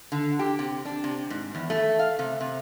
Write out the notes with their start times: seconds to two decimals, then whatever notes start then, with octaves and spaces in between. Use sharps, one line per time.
0.12 D3
0.39 G4
0.59 C3
0.85 D4
1.04 C3
1.30 G#2
1.55 E2
1.70 A3
1.99 F5
2.19 C3
2.41 C3